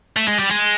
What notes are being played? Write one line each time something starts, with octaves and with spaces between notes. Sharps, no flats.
A3
G#3
G3
G#3